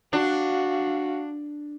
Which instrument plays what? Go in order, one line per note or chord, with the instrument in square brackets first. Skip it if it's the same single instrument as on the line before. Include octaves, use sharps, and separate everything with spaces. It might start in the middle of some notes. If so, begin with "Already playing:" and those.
[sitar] D4 [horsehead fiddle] F#4 F5